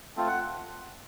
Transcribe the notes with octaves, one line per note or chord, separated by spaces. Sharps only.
A3 C4 F4
F#5